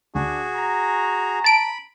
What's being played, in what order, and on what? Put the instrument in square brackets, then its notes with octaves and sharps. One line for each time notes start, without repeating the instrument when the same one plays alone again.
[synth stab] D2 [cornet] D4 [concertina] F#4 G#4
[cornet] A#5
[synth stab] A5 D7 [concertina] B5